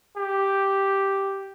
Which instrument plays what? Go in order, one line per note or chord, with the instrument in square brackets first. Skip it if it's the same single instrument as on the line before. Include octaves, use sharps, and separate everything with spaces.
[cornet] G4